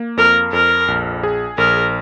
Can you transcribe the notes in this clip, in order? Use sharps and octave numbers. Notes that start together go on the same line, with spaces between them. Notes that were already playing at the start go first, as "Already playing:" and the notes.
Already playing: A#3
F2 A#4
F2 A#4
A#1
G#4
A#1 A#4